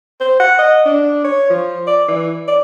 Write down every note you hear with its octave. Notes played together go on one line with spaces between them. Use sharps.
C5
F#5
D#5
D4
C#5
F3
D5
E3
D5